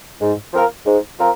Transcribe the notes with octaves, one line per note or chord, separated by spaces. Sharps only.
G#2
F3 C4 F4 A#4
G#2
F3 C4 F4 A#4